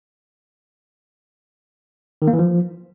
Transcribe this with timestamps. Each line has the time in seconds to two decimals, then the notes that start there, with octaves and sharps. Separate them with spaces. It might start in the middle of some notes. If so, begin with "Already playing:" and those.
2.22 D#3
2.27 A#3
2.33 E3
2.39 F3